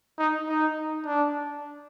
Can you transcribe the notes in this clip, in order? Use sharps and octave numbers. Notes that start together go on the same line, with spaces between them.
D#4
D#4
D4